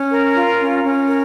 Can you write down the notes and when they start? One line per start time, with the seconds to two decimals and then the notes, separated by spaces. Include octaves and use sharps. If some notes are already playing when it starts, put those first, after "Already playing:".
Already playing: C#4
0.10 A#4
0.34 F4
0.59 C#4
0.83 C#4
1.08 A#4